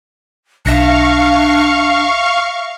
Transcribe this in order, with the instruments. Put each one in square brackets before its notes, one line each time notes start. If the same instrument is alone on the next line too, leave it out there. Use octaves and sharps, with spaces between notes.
[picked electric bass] B1 [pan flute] D4 [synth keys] E5 A#6 C#7 [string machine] F5 C#6